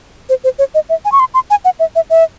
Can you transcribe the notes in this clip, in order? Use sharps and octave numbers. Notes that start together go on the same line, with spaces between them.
C5
C5
C#5
D#5
E5
G#5
C#6
C6
C6
G#5
F#5
E5
E5
E5